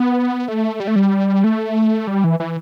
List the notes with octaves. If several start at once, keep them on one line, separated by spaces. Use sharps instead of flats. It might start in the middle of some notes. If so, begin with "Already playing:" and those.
Already playing: B3
A3
G3
A3
G3
A3
G3
E3
E3